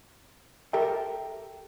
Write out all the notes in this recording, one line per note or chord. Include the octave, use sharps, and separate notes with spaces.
G4 A4 A#4 E5 G5